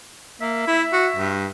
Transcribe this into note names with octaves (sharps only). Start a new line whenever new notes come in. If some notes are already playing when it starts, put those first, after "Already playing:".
A#3 E5
E4
F#4
G2